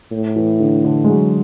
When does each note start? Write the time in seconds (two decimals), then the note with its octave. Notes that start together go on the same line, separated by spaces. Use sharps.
0.12 A2
0.36 E3
0.60 D3
0.84 D3
1.04 G#3
1.10 F#3